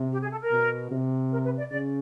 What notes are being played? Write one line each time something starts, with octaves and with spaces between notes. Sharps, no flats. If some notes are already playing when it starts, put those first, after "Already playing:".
Already playing: C3
G4
G#4
A4
A#4
B2
C3
A#4
B4
D5
C#3 D5